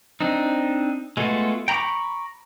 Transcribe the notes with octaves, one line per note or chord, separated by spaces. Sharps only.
C4 D4 D#4
G#3 A3 B3 F4 F#4
G5 A#5 B5 C#6 D6